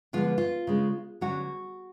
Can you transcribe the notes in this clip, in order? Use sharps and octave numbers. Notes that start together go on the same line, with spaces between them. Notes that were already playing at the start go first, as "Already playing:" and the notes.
D3 F3 G#3 B3 F4
F4
C#3 G#3 D4
D3 F#3 C#4 F#4